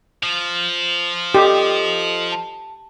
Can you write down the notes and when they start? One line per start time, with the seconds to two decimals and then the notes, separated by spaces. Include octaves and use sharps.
0.23 F3
1.35 G4 A4 D#5 D#6
2.32 A5